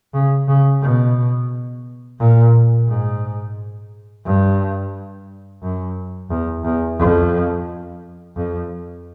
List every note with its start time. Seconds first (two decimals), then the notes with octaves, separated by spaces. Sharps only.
0.13 C#3
0.48 C#3
0.82 B2
2.19 A#2
2.88 G#2
4.25 G2
5.62 F#2
6.30 E2
6.64 E2
6.99 F2
8.36 F2